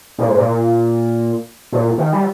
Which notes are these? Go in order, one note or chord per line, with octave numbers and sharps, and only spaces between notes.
A#2
G#2
A#2
A#2
D#3
G3